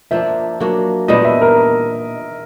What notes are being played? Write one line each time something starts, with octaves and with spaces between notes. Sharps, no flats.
F3 A#3 D4 E5
F#3 A#3 D4 F#4
A#2 G3 B3 D4 D#5
E5
A#4